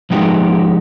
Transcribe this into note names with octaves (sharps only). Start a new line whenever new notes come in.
F3 G#3 B3 D#4 F#4 G4